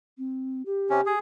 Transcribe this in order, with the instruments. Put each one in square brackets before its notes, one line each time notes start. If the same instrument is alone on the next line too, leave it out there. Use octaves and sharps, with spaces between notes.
[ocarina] C4
G4
[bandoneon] C3 C#4
G#4